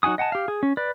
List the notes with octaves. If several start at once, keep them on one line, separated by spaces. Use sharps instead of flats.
F#3 D#4 F#4 G#5 D#6
D#5 F#5 G#5 A5
G4 F5
G#4
C#4
B4 D5